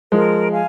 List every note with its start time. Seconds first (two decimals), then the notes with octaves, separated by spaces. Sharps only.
0.12 F3 G#3 A#4
0.52 F5 G#5